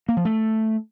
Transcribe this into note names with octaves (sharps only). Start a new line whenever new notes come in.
A#3
F3
A3